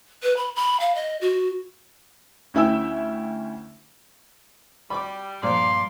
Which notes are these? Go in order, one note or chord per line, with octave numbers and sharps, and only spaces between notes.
B4
B5
B5
F5
D#5
F#4
D2 C#4 E4 E5 G5 E6
G3 B5 D6
G2 A#2 F3 D5 F5 C6